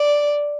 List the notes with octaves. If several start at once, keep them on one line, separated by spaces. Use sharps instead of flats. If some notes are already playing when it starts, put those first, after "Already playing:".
Already playing: D5